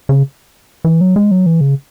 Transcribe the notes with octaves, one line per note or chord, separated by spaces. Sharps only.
C#3
E3
F#3
G#3
F#3
E3
C#3